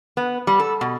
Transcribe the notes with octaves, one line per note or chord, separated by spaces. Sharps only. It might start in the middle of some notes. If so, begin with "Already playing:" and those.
B3
G3
A4
B2